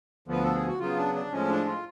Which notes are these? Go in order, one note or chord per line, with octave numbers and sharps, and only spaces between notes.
D2 D3 F3 B3 B4
A4
G#4
F#4
C#3 F#3 B3 F4
D4
D4
A2 F3 G#3 C#4
D4
F4